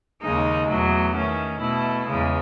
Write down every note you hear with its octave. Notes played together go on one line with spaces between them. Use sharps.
D#2 C#3 G#3 D#4
E2 B2 F#3 A3
D#3 A3 C#4
B2 A3 E4
E2 C#3 G#3